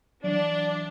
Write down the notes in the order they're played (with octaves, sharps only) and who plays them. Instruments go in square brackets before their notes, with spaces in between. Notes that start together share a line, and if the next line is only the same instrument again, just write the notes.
[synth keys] E3 F#3 [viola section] D4 [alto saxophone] D5